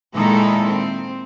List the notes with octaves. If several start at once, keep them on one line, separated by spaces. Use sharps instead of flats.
A#2 D#3 G#3 D#4 E4 A4
C4